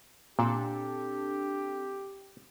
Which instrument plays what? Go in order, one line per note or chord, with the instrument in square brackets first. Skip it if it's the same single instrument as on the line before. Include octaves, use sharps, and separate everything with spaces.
[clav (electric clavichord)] A#2 [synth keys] C4 D4 A4 [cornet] G4